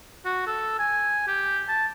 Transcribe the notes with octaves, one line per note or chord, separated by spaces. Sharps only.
F#4
A4
G#5
G4
A5